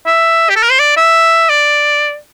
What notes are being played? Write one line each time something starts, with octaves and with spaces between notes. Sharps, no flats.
E5
G4
A4
A#4
C5
D5
E5
D5